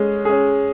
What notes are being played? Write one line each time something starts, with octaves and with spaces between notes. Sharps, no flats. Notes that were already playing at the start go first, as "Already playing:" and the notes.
Already playing: G#3 C#4 G#4
C#4 G#4